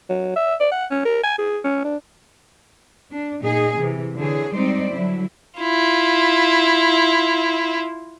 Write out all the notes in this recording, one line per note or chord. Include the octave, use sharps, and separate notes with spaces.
F#3
E5
D5
F#5
C#4
A#4
G#5
G#4
C#4
D4
D4
A#2 D#4 G#4
C3 E3
D3 E3 G#4 C#5
G3 G#3 C4 D#4 C5 D5
D3 F#3 G3 E4
E4 F4